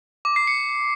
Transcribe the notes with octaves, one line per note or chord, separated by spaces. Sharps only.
D6
C7
C#7